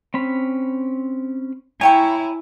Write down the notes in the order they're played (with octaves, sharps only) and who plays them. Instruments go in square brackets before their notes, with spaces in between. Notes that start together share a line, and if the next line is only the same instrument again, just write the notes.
[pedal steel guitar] C4 C#4 B5
[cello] E4 [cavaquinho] C#5 G5 C#6 [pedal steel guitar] G#5 A#5